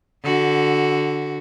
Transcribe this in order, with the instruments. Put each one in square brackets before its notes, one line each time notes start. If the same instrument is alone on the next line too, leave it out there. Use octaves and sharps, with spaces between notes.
[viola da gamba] D3 F#4